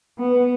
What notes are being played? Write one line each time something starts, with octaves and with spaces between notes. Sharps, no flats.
B3